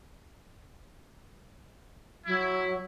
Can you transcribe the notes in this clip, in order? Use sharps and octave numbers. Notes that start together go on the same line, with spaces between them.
F#3 E4